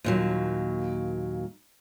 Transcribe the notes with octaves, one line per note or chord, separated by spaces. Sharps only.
D#2 A#2 F#3